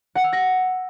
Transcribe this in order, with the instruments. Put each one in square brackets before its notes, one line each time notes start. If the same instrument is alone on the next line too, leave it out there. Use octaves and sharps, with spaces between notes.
[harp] F#5
E6
A#6